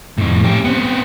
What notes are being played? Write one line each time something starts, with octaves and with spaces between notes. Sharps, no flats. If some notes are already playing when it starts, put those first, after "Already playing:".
F2 A2
C#4 G4
B3 C4